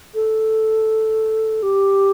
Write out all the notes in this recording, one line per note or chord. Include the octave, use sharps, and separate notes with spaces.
A4
G4